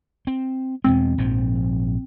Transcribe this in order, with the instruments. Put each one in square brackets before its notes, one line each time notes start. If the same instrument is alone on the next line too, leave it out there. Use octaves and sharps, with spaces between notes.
[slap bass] C4
[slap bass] E2 B2 G#3 [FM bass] C4
[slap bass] A#1 G#2 F3